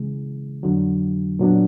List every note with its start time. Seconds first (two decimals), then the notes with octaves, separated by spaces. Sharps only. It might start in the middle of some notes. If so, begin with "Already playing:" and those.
Already playing: C#3 E3 G#3
0.63 F2 D3 F#3
1.39 A#2 F#3 B3 D4